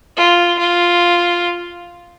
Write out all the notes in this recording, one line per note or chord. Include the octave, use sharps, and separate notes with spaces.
F4
F4